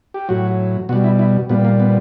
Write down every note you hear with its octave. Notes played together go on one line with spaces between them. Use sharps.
G4
A2 F#3 F#4
B2 G3 F#4
E4
E4
A#2 G3 B3
A#3
B3